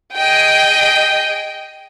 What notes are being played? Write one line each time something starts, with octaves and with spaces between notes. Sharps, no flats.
G#4 D#5 G5